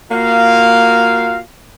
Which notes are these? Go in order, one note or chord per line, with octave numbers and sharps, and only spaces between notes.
A#3 F4 F#4 F5